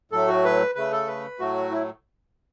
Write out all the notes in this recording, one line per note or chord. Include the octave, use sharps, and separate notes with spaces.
A2 F#3 A3 A4
F#4
B4
C#3 A3 B4
A4
B4
A2 F#3 A3 F#4
E4